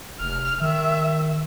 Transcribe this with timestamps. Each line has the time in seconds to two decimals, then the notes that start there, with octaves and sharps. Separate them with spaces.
0.20 F1 F6
0.62 D#3 E5